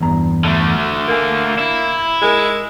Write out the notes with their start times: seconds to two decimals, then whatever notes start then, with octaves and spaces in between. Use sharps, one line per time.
0.01 E2 G2 A#5
0.45 D3 A3
1.08 A#3 A#4 G#5
1.58 E4
2.22 G#3 G#4 A#4